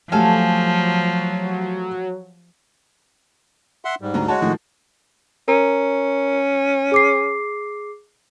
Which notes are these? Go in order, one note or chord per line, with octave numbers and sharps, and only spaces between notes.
F3 F#3 A3 G4 A4 F5 G#5
E5 F#5 C6
G#2 G3
D2 A#5
G#3 F#4 C#5 A5
A2 D#3 F3
C#4 A#4 A#5
G#4 D6 C7